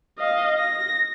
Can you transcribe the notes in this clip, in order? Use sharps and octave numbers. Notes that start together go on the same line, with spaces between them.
D#5 F5
A#6